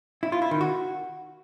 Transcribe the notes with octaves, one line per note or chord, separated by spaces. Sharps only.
E4
F4
E4
D#3
F#4